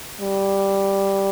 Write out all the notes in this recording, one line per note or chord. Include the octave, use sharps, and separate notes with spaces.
G3